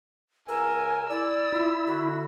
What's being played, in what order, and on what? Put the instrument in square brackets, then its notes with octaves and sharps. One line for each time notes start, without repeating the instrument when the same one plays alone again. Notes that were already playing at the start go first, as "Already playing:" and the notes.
[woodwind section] C#2 E6 [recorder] A#4 [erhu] G#5
[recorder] E4 [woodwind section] D5 [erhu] E6
[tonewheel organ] E4 [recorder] F4
[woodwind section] D3 [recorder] F#4